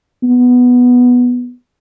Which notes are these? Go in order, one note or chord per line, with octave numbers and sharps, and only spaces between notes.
B3